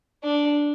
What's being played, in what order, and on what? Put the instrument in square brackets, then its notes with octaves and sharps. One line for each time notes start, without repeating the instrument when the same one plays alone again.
[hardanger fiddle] D4